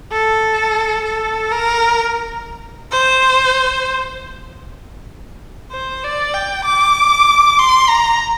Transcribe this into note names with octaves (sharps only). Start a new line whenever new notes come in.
A4
A4
A#4
C5
C5
D5
G5
D6
C6
A#5